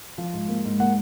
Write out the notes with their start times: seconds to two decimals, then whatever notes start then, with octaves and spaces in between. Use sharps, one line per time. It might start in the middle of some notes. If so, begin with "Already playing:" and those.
0.18 F3
0.33 G#2
0.49 A#3
0.65 G#2
0.80 A#3 F#5